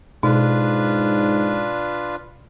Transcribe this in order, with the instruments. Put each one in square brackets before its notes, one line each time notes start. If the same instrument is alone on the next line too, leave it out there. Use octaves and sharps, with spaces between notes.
[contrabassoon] G#2 [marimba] B2 [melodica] D4 F4 B4